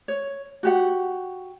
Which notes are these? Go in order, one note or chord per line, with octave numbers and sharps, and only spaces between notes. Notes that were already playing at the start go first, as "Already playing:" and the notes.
C#5
F#4 G4 F#5